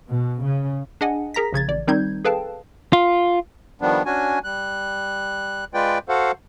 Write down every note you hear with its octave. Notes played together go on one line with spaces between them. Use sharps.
B2
C#3
D4 G#4 D#5 F#5 G#5
G#4 A#4 A#5 A#6 B6
A#1 C#3 G#6 A6
A1 D5
D#3 G3 C4 D#4 G6 G#6
G#4 A4 B4 F5 G5 A5
F4
D#3 F3 G3 B3 D4
C#4 D4 F#4 G#5
G3 F#6
G#3 F4 B4 D5 G5
F#4 A4 C5 F5 F#5